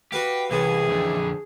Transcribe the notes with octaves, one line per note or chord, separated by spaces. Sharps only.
F#4 G4 B4 F5
C2 E3 C#4 G#4
F2 D3